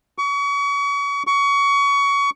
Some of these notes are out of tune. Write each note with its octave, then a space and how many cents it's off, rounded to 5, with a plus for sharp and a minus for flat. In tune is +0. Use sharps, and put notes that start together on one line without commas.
C#6 +35
C#6 +25